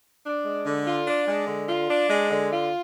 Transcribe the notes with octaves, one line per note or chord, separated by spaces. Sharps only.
D4
G#3
D3
F4
D4
G#3
D3
F4
D4
G#3
D3
F4